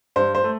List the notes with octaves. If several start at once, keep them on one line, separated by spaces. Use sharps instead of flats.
G2 C5
C5
A3